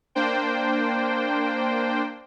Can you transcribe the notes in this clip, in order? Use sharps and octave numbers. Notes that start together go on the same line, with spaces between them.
A#3 D4 C5 G5